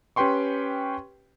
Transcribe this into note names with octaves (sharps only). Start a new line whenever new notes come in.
C#4 G4 B4 G5 C6 C#6